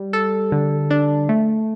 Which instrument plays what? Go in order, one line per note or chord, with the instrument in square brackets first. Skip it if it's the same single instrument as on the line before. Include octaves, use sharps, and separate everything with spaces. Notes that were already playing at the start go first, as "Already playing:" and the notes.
Already playing: [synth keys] G3
A4
D3
D4
A3